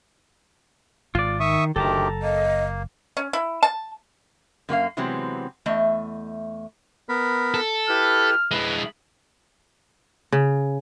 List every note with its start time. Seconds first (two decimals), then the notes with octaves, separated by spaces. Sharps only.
1.15 G#1 G#2 F4 D5
1.40 D#3 E5 C#6 D#6
1.76 F#1 D2 D#3 G4 A4 A5 A#5
2.23 A#3 D#5
3.17 C#4
3.33 E4
3.63 A5
4.69 F#2 A#3 F#4 F5
4.97 C3 E3 F#3 G#3 B3 C4
5.66 E2 A3 D#5 E5
7.09 B3 A#4 B5
7.54 A4
7.89 E4 G4 B4 F6
8.51 G#3 E4 B4
10.32 C#3